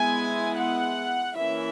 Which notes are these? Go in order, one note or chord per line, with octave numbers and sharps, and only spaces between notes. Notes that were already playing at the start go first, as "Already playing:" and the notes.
Already playing: G#3 B3 E4 G#5
F#5
E3 A#3 C#4 E4 E5